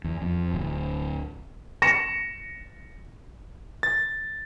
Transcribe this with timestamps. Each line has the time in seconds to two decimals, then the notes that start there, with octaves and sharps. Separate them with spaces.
0.04 E2
0.22 F2
0.54 D1
1.82 A#6 C#7 E7
3.83 A6